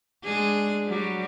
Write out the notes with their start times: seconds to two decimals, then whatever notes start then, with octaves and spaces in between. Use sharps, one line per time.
0.24 G#3 D4 G#4
0.87 F#3 G3 F#4